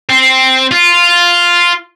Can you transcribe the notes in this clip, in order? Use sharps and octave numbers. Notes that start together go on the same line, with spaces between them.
C4
F4